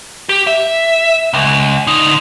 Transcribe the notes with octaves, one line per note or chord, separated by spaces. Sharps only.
G4
E5
C#2
D3 D#4